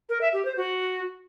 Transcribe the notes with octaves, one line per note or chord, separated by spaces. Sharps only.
A#4
E5
G4
C5
F#4